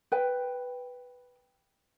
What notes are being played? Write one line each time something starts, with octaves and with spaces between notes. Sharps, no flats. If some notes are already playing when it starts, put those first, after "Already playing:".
B4 G5